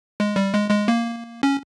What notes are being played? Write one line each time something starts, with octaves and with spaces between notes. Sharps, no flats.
G#3
G3
G#3
G#3
A#3
C#4